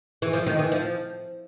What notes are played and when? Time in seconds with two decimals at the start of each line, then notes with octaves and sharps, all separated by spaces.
0.22 E3
0.33 F3
0.46 D#3
0.59 E3
0.72 F3